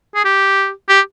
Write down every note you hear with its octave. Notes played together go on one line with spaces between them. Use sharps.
G#4
G4
G4